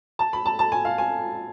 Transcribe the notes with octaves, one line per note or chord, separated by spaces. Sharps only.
A5
B5
A5
A5
G#5
F5
G#5